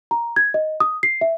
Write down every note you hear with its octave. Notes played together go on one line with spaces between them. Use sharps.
A#5
G#6
D#5
D#6
C7
E5